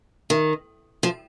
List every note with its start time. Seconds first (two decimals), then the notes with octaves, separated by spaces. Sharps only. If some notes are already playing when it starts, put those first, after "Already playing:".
0.30 D#3
1.03 F3